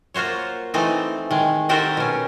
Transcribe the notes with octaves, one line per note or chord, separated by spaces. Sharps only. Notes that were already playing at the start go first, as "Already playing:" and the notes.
A#3 F4 F#4 C5 C#5
E3 A3 C4 D#4 C5
D#3 G#3
C4 F#4 G4 A4 A#4 C5
B2 C#4